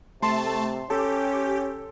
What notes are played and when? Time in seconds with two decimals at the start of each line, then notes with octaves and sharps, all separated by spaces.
0.22 C3 A3 A5 C6
0.90 C#4 G4 A4